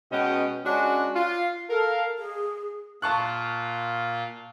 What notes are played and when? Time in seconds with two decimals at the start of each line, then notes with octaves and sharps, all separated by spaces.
0.11 B2 G#3 B3 C#4 D#5 G5
0.64 G#3 C#4 D4 F#4
1.14 F4
1.69 A4 A#4 F5
2.18 G#4
3.02 A#2 F4 A5 C#6 F#6